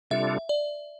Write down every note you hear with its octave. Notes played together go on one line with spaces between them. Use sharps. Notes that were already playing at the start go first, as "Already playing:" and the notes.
C3 G3 D4 F4 A4 E5
D5